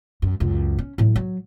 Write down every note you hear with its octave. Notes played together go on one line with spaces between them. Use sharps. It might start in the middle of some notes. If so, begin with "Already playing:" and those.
F#2
C#2 F#2
C#4
A2 F#3
F#3